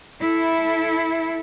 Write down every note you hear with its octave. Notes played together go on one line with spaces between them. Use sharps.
E4 A4